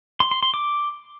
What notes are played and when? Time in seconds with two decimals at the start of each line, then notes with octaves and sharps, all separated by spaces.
0.20 C6
0.31 C6
0.43 C6
0.54 D6